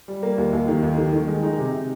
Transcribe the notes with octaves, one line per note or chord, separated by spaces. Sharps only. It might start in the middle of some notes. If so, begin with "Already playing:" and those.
G3
A#3
D#2
D#2
D#3
D#2
D#3
D#3
G#3
D#4
C3
C3